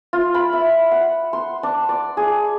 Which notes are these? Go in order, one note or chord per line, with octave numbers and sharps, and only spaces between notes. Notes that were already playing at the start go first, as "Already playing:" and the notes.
F4
B5
E5
F#5
C6
D4
D5
G#4